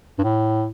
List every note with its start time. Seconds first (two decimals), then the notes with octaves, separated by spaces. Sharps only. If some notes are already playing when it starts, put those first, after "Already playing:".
0.19 G2
0.24 A2